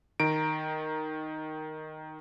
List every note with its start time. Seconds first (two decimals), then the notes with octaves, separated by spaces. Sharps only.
0.20 D#3 A#5 D7